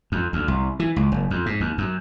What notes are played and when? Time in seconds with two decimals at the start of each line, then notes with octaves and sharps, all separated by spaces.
0.12 F2
0.33 D2
0.48 C2
0.80 E3
0.96 C#2
1.12 F#1
1.31 F2
1.46 G#2
1.60 D#2
1.78 F#2